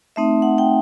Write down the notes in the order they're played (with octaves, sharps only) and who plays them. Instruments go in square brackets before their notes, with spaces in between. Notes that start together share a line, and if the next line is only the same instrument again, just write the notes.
[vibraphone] A3 C4 D#4 E5
F#5
G5